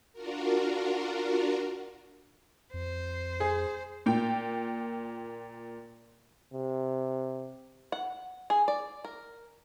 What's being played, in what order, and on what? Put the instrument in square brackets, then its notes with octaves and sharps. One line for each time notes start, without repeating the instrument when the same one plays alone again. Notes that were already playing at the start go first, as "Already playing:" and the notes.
[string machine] D4 F4 F#4 A#4
[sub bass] F2 [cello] C5
[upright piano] G#4
[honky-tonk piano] A#2 G5
[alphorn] C3
[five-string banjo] F#5
G#4
D5
A#4